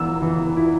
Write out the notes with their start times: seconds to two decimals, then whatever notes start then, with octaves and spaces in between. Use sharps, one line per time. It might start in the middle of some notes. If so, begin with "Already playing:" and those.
Already playing: E3 B3 E6
0.22 E3
0.57 E4